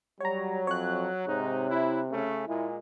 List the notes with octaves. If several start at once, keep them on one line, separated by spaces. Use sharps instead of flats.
F#3 G3 C#5 A#5
F2 C#5 F#6
G#2 C3 D#4
E4
C#3 A3 C#4
A#2 G#3 E4